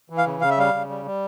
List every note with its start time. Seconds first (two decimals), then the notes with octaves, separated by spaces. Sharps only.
0.10 E3
0.18 F5
0.26 C#3
0.41 C#3 F5
0.50 E5
0.58 G3 F5
0.74 C#3
0.89 G3
1.06 G3